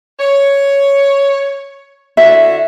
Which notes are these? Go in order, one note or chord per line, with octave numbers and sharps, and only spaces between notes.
C#5
D3 E4 F#4 E5